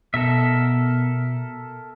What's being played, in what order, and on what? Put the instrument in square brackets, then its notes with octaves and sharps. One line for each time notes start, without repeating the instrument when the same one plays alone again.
[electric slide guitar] B2 [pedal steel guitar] A4 A#4 E5